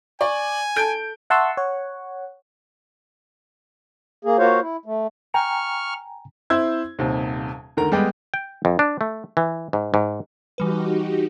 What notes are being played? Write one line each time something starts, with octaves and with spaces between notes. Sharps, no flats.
D5 G#5 C#6
A4 A5 G6 D7
E5 F#5 A5 C6 C#6 E6
C#5 F#5
A#3 G#4
A#3 F4 F#4 C5 C#5 F5
E4
A3
G5 G#5 A#5 C#6 F6
C4 E4 C5 E6 G#6
D#1 D#2 C3
D2 D#3 A#4 A#5
G3 G#3 B3 G4
G5
F2
D4
A3
E3
G#2
G#2
E3 G3 D#4 F#4 G4 B4